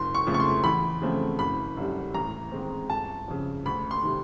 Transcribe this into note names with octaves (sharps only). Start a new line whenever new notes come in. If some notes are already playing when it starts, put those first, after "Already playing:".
Already playing: F#1 C6
C#6
F2 C#3 F3 A3
C#6
C6
E2 B5
C#3 F3 A3 C4
F#1 B5
F#2 D3 G3
A1 A#5
G#2 D#3 G#3 C4
G1 A5
F2 C#3
D2 B5
C6
C3 D#3